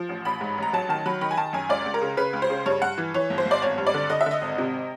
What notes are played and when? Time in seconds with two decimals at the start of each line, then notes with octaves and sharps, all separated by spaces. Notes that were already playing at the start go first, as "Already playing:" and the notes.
Already playing: F3
0.09 A1
0.25 A1 B5
0.41 G#2
0.58 A1 A#5
0.73 F#3 A5
0.89 D#3 A5
1.06 F#3 B5
1.21 D#3 B5
1.31 G#5
1.37 D#3 A5
1.53 F#2 G#5
1.69 C#2 D5
1.86 C#2
1.94 A#4
2.02 C#3
2.17 C#3 B4
2.33 C#2
2.42 C5
2.50 C#3
2.66 G2 C#5
2.82 G2 F#5
2.98 E3
3.14 E3 C#5
3.30 G1
3.38 C5
3.46 G1
3.51 D5
3.62 G#1 C#5
3.78 G2
3.87 D5
3.94 D3
4.10 D3 D#5
4.21 E5
4.26 D3 D#5
4.42 G#1
4.58 C3